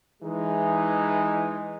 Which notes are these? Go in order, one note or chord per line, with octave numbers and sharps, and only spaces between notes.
E3 G#3 D#4